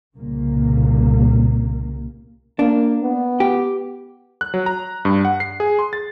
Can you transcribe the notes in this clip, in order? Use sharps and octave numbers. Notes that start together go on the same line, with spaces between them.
C2 A#2 C#3 A#3
A#3 D4
B3
G4
F#6
F#3
A#5
G2
F#5
C7
G#4
C6
A6